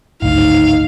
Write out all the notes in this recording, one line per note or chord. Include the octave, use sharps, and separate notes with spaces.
D1 G#1 D2 D#4 F5